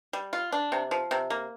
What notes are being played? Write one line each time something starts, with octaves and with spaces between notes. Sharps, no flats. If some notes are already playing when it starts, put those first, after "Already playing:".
G3
F4
D4
C3
F3
C3
A#3